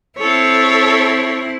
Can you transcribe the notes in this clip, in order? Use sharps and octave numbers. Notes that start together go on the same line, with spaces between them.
C4 E4 A4 C#5